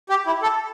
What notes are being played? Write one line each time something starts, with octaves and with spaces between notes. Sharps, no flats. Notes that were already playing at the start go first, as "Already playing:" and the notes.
G4
E4
A4